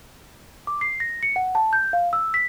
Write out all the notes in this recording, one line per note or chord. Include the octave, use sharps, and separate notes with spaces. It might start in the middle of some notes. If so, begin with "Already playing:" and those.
D6
C7
A#6
C#7
F#5
A5
G6
F5
E6
B6